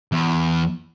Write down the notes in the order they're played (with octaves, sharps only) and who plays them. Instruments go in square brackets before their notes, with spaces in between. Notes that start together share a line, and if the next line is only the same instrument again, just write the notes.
[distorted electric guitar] E2